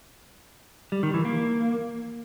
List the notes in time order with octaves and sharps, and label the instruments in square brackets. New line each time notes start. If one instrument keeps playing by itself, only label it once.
[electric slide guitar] G3
D#3
E3
A#3